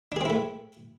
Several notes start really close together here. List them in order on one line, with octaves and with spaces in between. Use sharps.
D4 G#4 C4 E4 A3